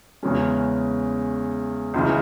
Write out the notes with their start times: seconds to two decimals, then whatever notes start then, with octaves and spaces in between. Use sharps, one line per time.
0.23 E2 C#3 G#3 C#4
1.94 C#2 C#3 E3